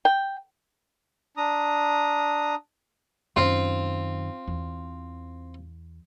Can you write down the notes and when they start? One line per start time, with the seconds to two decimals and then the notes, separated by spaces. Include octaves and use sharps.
0.05 G5
1.37 D4 A#5 D#6
3.36 F#2 D#3 C4 F4
4.48 E2